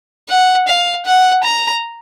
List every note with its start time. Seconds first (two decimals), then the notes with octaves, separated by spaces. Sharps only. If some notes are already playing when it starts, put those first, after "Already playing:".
0.29 F#5
0.68 F5
1.06 F#5
1.43 A#5